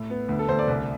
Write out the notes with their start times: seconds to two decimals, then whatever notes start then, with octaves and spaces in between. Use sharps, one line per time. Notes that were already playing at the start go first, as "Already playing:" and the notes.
Already playing: A2
0.10 B3
0.29 D2
0.39 A4
0.48 D2 C5
0.59 D5
0.68 C2